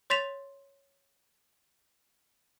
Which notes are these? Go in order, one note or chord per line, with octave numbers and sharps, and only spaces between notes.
C#5 C6 A6 B6 E7 F7